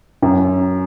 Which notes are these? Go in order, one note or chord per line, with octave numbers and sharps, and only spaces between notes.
F#2